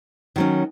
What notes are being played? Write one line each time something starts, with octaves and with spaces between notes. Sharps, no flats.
D#3 F#3 C#4